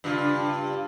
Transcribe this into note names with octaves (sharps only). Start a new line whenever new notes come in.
G2 C#3 F4